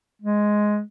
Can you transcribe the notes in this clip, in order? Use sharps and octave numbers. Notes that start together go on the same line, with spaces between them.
G#3